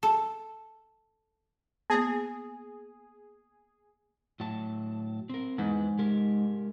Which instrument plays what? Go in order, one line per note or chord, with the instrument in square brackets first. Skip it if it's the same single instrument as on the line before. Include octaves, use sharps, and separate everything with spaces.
[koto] A4
[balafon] A#3 B3 [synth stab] G#4
[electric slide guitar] A2 F#3 A5
C4 A#4
[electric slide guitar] E2 E3 B4 [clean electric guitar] G#2
[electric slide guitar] G#3 G4 A#4